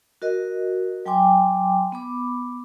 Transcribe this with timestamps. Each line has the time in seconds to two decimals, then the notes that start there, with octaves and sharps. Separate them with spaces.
0.22 F#4 A#4 D#5
1.06 F#3 G5 G#5 C6 D6
1.92 B3 B5 D6